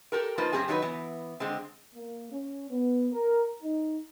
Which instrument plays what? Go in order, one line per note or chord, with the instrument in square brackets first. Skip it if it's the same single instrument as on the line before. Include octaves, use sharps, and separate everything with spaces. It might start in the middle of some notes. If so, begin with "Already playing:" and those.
[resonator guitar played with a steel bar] G4 A4 A#4
F3 A#3 D#4 F4 B4 C5
F#2 B2 C4 G4 G#4 G#5
D#3 F#3 D4 D#4 B4
E3 B3
D3 G#3 C4
[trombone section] A#3
C#4
B3
A#4
D#4